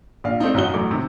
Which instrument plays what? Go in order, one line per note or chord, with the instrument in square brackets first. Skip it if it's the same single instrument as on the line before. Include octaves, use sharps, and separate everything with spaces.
[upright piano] A#1 D4 F5
A3 C4 D4 D#4
B1 F#2 D#4 F#4 G7
E1 A1 F#3 A3 D6
C3 D#3